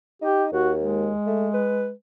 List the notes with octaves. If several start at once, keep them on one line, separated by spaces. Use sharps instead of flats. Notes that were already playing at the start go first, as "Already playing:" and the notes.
D#4 G4
D#2 F#4
G#3
A3
B4